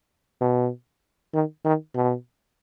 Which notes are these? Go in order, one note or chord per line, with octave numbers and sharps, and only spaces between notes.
B2
D#3
D#3
B2